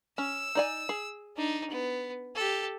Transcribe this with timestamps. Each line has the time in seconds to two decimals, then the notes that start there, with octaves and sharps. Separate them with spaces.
0.18 C#4 E6
0.55 D#4 D5 G#5
0.89 G#4
1.37 D4 D#4
1.70 B3
2.36 G4 A4